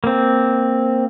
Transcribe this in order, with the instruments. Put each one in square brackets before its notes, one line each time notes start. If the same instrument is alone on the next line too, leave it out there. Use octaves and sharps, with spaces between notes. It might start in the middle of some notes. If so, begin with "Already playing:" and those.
[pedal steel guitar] A#3 C4